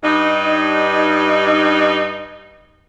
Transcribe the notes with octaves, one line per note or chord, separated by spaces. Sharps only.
G2 D#4